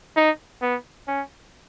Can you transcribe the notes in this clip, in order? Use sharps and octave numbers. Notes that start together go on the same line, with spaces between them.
D#4
B3
C#4